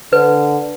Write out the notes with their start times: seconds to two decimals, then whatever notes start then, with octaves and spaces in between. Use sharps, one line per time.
0.12 D3 B4